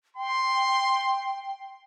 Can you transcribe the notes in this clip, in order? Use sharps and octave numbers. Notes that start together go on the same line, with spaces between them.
G5 C6